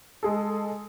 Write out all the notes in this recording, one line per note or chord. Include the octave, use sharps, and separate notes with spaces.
G#3 G#4 A4